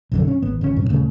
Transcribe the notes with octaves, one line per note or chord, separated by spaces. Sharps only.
B1 F#2 D3
C#4
G#1 B3
G#1 C#2 B2 C#4
G2 C3
D#1 C#3 A3